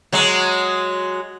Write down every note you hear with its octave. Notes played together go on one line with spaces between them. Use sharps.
F#3 G#3